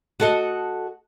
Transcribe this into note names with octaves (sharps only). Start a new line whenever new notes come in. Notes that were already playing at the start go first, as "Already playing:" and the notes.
F#4 A4 D#5